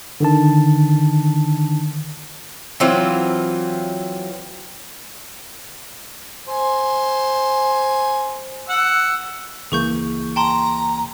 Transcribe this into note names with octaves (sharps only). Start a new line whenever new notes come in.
D3 D#3 A5
E3 F#3 C4 F4
C5 G#5
F#5 E6
C#2 E3 A#3 G#4 C#6 G6
G5 A5 A#5 C6